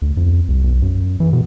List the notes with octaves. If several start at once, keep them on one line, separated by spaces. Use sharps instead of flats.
D2
F2
C2
B1
F#2
E3
B2